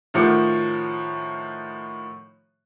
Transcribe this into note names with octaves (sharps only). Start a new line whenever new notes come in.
A2 D#3 F3 F#4 D6 C#7